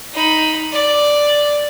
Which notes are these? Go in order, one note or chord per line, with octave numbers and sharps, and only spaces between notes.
D#4 B5
D5